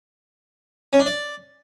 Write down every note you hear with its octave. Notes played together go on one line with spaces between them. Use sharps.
C#4
D4
D5